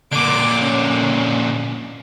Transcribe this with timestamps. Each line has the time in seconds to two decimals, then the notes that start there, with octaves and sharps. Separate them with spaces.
0.12 A#2 D3 D6
0.61 C#4